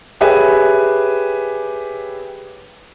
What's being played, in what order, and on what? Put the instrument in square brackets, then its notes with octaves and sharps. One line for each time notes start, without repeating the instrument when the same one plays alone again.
[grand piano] G4 G#4 B4 C#5 E5 G#5